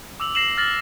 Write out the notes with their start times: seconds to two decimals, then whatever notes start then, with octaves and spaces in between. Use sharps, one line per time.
0.20 D6 E6 F7 F#7
0.35 A#6 C7 E7 F#7
0.57 F6 A6 A#6 F#7